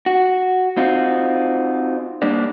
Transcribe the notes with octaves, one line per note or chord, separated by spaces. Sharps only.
F#4
C4 D#4 F4 F#4
G3 A#3 D4